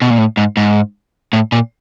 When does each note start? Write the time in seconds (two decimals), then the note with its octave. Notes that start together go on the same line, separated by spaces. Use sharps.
0.02 B2
0.10 A#2
0.18 A2
0.37 G#2
0.57 G#2
1.33 A2
1.52 A#2